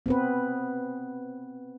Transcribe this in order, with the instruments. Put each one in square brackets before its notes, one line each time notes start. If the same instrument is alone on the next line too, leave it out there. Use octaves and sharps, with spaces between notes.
[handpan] B3 C4 B4